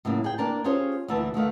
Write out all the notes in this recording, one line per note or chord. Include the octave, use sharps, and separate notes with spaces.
A2 C#3 F#3 A#3
G#4 G5
A#3 D4 A#4 A5
C#4 F4 G4 G#4 C5 C#5
D2 A#2 E3 E5 A5
D2 D#3 A3 F5